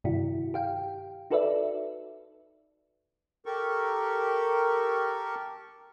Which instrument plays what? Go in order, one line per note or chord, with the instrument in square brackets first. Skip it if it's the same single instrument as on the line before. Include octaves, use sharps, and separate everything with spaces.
[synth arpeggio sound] G2 C3 D#3 E4 F#4
G4 F5 G5
D#4 F#4 A4 B4 D5 E5
[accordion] G4 A4 A#4 C#6